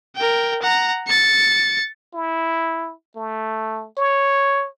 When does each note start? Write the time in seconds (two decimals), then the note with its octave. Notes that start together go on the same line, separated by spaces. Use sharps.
0.16 A#4 G5
0.62 F#5 A#5
1.07 A6 C#7
2.14 E4
3.16 A3
3.98 C#5